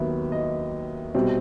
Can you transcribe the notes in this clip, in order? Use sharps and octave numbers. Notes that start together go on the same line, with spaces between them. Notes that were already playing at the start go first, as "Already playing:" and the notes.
Already playing: D#2 D#3 F#3 B3 E5
D#5
C2 B2 G3 C4